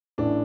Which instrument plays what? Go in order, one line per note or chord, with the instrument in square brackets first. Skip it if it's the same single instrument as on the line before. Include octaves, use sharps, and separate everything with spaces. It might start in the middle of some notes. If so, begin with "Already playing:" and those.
[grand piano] A1 A2 E3 D4